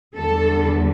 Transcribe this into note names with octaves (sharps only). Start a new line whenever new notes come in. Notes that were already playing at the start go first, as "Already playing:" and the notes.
E2 D3 G3 A4